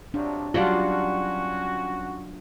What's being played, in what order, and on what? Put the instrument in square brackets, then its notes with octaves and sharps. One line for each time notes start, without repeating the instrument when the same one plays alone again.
[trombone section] C3 F3 F#3 [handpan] D4
[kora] F#3 G3 D4 [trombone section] C#4 F#4 [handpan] F4 F#5